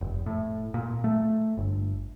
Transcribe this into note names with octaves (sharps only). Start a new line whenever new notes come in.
F1
A2
A#2
A3
G1